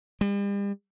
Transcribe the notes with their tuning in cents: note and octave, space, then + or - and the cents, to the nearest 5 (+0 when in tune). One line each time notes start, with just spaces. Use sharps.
G3 +40